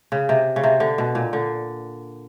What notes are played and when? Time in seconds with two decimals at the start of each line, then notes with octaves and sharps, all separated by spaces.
0.12 C#3
0.29 C3
0.56 C#3
0.63 C3
0.80 D3
0.98 B2
1.15 A#2
1.33 D3